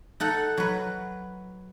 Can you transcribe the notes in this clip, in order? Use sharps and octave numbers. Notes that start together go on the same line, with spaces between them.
D#4 A4 F#5
F#3 B4